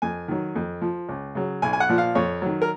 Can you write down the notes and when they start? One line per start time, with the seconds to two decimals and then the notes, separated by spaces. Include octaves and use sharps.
0.02 F2 G#5
0.28 D#3 F#3
0.55 F2
0.82 F3
1.09 C#2
1.35 C#3 F#3
1.62 B1 G#5
1.73 G#5
1.80 F#5
1.89 A#2 F3
1.98 F5
2.15 F2 C#5
2.42 D#3 F#3
2.62 A#4